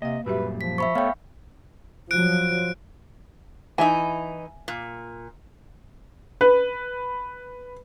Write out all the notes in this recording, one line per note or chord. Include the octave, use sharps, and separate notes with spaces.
C3 A#3 D#5 F5
F#2 A#2 G3 F#4 G4 B4 E5
F3 B6
C5 E5 B5 C#6
A3 B3 A4 C#5 F5 G5
F3 F#3 F#6 D7
E3 D#4 E5 G#5
A#2
B4